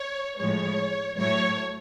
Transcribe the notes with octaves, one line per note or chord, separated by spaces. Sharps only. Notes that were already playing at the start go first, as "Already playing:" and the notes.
Already playing: C#5
A2 F3 G#3 C#5
A2 F#3 A3 C#5